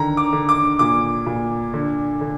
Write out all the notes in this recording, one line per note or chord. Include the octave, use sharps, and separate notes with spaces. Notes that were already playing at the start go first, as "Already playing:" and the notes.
Already playing: D3 D#3 A#5
D6
D3
D6
A#2 D6
A#2
D3
D3